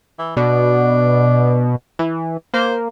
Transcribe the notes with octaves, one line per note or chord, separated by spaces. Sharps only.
E3
B2 D4
E3
A#3 C5